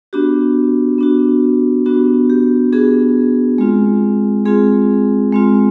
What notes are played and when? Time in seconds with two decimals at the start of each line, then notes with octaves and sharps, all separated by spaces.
0.13 B3 D4 F#4 G4
0.98 B3 D4 F#4
1.86 B3 D4 F#4
2.30 G4
2.72 B3 D4 F#4 G#4
3.58 G#3 C4 F4
4.45 G#3 C4 F4 G#4
5.32 G#3 C4 F4